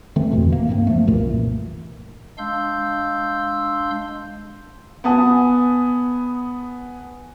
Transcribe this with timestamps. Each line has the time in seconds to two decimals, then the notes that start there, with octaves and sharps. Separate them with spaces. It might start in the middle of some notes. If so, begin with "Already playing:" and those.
0.16 D3 E3 A3 C4
0.32 G1 F2 B2 E3
0.52 A#3
0.67 C#2 G2 A#3 C4
0.87 F3 A3
1.07 C2 F#2 A#2 E3
2.38 G#3 D4 F5 C6 E6 G6
5.04 B3 G#5 A5 D#6